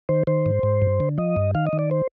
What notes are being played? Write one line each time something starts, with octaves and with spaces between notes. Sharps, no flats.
D#3 C5
D#3 C5
G#2
G#2
G2
D3
F3 D#5
G2
D#3 F5
D#5
D#3
D5
C5